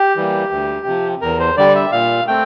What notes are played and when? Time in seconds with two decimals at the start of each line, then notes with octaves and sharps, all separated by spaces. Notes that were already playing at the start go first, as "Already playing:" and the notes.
Already playing: G4
0.16 E3 G3 A#3
0.51 D2
0.86 C3 F3
1.21 E2 A#4
1.40 C5
1.57 D3 G3 D5
1.75 E5
1.92 A#2 F5
2.28 A3 C4 G5